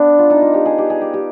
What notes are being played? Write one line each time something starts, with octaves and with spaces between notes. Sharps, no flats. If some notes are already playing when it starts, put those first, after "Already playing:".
Already playing: B3 D4
F4
D#4
F4
G4
G#4
G4
G#4
G4
G4